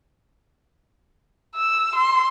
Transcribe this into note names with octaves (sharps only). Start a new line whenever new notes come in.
E6
C6